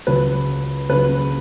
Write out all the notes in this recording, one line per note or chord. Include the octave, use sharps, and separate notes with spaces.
C#2 C#3 F#3 B4
C#2 C#3 F#3 B4